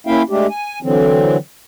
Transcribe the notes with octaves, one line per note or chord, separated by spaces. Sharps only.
A#3 C#4 E4 E5 F5 G5
G#3 A3 D4 G4
G#5
D3 E3 F#3 C4